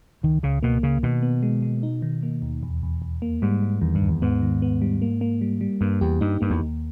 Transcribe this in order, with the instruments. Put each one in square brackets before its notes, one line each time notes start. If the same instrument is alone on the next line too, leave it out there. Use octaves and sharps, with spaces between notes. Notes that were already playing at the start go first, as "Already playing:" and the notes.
[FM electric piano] C#2 [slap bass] D#3
[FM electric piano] C#2 [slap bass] C#3
[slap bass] B2 [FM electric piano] A#3
[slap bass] C#3 [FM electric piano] A#3
[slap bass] B2 [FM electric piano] D#3
[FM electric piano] B3
G#3
G#3
D#4
D#3
A#3
D#2
E2
E2
E2
A#3
[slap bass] G#2 [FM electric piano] G3
[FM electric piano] G3
[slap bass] E2 [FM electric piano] D#3
[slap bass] G2
[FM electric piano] D#2
[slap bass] E2
[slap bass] G#2 [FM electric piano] B3
[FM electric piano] D#3
B3
G3
A#3
A#3
G3
G3
[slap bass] G2 [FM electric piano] A#3
[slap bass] E2 [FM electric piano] G4
[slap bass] G2 [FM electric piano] D#4
[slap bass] G2 [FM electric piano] A#3
[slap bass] E2
[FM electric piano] D#2